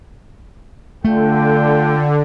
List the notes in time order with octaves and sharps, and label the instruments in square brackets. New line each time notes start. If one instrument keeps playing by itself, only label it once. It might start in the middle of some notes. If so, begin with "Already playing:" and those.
[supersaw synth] D3 [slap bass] A3 [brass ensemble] F4 A4 G5